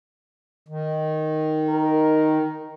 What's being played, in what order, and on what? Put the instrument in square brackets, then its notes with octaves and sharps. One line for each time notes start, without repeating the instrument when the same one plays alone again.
[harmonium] D#3
[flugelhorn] A#4